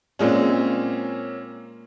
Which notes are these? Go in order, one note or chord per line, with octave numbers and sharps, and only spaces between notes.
A#2 G#3 A#3 C4 C#4 F#5